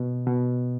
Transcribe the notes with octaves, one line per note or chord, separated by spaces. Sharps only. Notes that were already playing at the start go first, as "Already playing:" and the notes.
Already playing: B2
B2